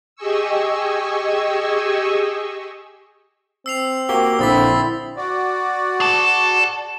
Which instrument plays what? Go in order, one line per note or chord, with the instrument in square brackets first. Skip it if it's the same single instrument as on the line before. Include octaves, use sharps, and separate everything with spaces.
[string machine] G4 G#4 D#5 G#5 C#6 E6
[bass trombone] C4 [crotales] E6 C7 F7
[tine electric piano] A#3 F#4 G4 [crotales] G7
[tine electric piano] A#1 D3 [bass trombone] C4 [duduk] E4 [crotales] D#6 A6 B6
[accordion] F#4 D5
[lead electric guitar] G#4 A5